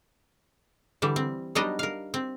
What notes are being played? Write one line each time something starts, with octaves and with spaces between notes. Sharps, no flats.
D3 E3 G3
C4
F#3 G3 B3 D4 D#4 D#5
A#4 F5
C4